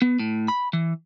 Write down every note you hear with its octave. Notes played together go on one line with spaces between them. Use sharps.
B3
A2
B5
E3